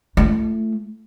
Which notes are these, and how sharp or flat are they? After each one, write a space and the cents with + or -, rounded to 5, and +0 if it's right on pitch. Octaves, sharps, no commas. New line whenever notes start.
A3 +0 E4 +45